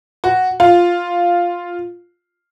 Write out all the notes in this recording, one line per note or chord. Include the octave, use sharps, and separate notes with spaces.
F#4
F4